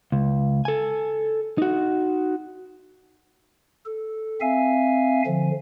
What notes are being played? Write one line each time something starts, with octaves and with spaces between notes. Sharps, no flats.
C#2
A4 G#5
D#4 F#4
A4
C4 E5 F5 G#5
D3 F3